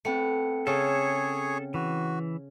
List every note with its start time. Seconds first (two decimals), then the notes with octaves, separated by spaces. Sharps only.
0.05 A3 B3 C4 G5 C#7
0.67 C#3 G#4 A4 C#5
1.74 E3 F#4